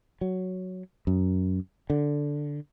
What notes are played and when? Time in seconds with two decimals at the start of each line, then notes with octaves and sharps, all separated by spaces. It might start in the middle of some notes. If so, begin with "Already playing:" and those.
0.21 F#3
1.07 F#2
1.90 D3